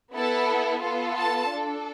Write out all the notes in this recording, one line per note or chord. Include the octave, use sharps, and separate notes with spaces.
B3 E4 A4 A5
B3 F4 A4
A5
D4 A4